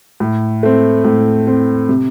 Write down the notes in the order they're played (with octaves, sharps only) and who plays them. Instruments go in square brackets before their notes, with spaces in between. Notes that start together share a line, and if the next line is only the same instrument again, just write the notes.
[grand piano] A2
A3 C4
A2
A3 C4
C3